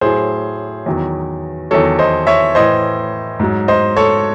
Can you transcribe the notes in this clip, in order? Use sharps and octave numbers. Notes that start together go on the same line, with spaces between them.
A2 F#3 G#4 C5
E2 D#3 F#3
E2 D#3 F#3 A4 C#5
C5 D#5
C#5 E5
A2 E3 C5 D#5
G#2 F#3
C5 D#5
A4 C#5